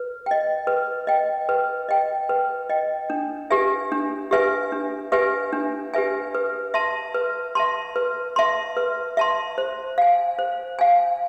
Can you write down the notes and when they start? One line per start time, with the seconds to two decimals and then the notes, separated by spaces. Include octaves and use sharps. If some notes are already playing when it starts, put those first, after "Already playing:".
Already playing: B4
0.26 D#5 G5
0.67 B4
1.07 D#5 G5
1.49 B4
1.89 D#5 G5
2.29 B4
2.70 D#5 G5
3.10 D4
3.50 G4 B4 E5 G#5
3.92 D4
4.31 G4 B4 E5 G#5
4.72 D4
5.12 G4 B4 E5 G#5
5.53 D4
5.94 G4 B4 E5 G#5
6.35 B4
6.74 E5 A5 C6
7.14 B4
7.55 E5 A5 C6
7.96 B4
8.36 E5 A5 C6
8.77 B4
9.17 E5 A5 C6
9.58 C5
9.98 F5 G#5
10.39 C5
10.79 F5 G#5